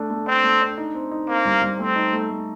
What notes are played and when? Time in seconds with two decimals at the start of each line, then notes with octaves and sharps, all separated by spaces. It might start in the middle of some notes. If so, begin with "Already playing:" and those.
Already playing: A3 D4
0.10 A3
0.27 C4 D4
0.44 A3
0.61 D4
0.78 D#4
0.94 C4
1.11 D#4
1.28 A#3 C4
1.45 G3
1.62 G3
1.79 A3 C4
1.96 D#4
2.13 A3
2.30 A3